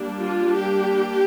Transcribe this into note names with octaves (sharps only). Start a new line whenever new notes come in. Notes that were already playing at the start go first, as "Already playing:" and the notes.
Already playing: G3 A#3 D4
F4
G4